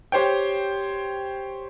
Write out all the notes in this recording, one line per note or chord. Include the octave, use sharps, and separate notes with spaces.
G4 C5 C#5 G5